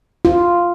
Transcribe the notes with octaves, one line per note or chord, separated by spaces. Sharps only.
F4